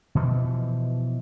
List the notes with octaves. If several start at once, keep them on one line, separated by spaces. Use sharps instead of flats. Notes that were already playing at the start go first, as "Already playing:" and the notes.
B2 E3 F3